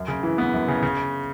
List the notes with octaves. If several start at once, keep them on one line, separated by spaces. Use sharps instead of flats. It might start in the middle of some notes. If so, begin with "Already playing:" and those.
Already playing: F#2
C#3
E3
B3
F#2
C#3
C#3